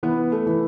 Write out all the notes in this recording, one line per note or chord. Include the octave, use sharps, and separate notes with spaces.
E3 B3
A3
E3